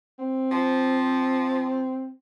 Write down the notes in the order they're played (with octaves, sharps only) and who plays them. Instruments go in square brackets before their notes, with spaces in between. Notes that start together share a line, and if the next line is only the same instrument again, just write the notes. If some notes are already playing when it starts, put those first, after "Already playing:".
[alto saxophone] C4
[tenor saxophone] F3